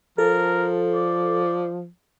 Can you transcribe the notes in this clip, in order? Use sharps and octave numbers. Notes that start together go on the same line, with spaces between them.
F3 A4 A#4
D5